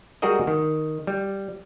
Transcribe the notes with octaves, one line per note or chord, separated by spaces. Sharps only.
G3 G#3 F#4 G#4 A#4 D#5
D#3
G3